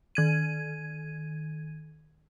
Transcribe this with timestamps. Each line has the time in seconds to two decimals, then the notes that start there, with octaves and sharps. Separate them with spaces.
0.15 D#3 G#6 D#7